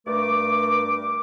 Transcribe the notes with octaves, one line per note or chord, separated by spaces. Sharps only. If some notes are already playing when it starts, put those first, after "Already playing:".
G2 A3 A#4 D6